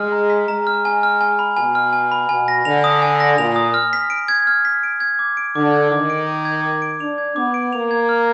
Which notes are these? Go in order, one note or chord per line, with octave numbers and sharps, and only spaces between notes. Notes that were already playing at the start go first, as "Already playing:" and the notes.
Already playing: G#3 F6
A#5
B6
G#3 A#5
F6
G#5
F6
G#5
B5
B2 G#5
F6
G#5
B5
B2 G#5
A#6
D3 F7
D#6
G#5
A#6
A#2 F7
D#6
F6
B6
D7
G#6
F6
B6
D7
G#6
D6
D7
D3 D6
G#6
D#3 D6
D7
D6
G#6
D6
D7
D4 F7
G#6
B3 D6
D7
A#3 F7
G#6
F6